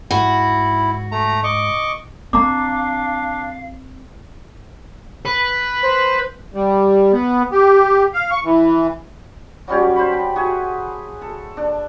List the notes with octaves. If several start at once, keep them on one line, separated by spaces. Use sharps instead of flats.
G#2 E4 F#4
A3 A#5
D#5 C#6 D6
C4 D4 F5 A#5 D6
B4
C5
G3
B3
G4
F5
C#6
E3
F#3 G3 C#4 G4
C5 A5 B5
G5
F#4 G#4 E5 G#5
A4
D4